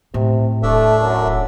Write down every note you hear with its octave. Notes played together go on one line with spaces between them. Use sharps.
A2 C3
D#1 A3 D4 E5
F#2